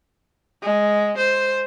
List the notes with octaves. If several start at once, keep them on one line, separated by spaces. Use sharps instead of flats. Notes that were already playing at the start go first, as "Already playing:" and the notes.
G#3
C5